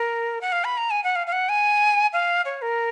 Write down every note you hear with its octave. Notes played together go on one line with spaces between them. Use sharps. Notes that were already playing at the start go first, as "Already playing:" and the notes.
Already playing: A#4
F#5
F5
B5
A#5
G#5
F#5
F5
F5
F#5
G#5
F5
C#5
A#4